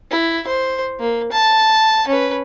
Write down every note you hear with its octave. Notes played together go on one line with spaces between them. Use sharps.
E4
C5
A#3
A5
C#4 B4